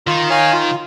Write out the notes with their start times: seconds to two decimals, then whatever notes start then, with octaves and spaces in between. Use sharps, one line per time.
0.07 D#3 F4
0.30 C#5 F5 G#5
0.53 F4